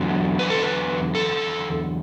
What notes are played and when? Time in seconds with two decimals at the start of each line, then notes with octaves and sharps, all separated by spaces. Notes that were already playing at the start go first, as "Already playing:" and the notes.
Already playing: E2 D3 F#3
0.39 B4
0.50 A4
0.62 B4
1.15 A4